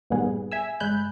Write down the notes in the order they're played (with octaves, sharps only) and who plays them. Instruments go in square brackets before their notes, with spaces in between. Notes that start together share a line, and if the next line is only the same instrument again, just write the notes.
[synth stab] A#1 G2 D#3 G3 B3 G#4
E5 G#5 E6
G1 G#3 G#5 B5 F#6 G6